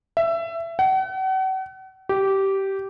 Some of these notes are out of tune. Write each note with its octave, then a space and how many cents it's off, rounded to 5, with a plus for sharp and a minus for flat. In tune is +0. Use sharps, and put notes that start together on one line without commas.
E5 +20
F#5 +40
G4 -15